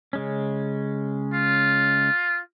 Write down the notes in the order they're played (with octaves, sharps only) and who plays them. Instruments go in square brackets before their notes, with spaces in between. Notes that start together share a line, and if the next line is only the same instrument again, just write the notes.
[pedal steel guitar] C#3 G#3 C#4
[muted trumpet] F4